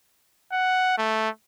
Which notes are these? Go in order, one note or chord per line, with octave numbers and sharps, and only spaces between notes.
F#5
A3